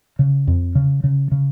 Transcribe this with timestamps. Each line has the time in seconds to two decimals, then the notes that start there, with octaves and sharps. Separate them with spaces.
0.19 C#3
0.47 F2
0.75 C#3
1.04 C#3
1.32 C#3